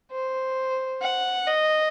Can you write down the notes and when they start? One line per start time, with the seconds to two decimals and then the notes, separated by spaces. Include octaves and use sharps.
0.12 C5
1.02 F#5
1.47 D#5